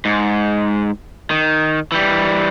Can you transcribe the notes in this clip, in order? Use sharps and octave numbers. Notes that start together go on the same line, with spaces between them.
G#2
D#3
E3 G3